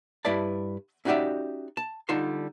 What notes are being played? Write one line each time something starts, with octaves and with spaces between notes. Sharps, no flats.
G2 E4 B4 D5 A5
C#4 D#4 F#4 G4 D5 E5
A5
D3 G3 D#4 F4 A5 C6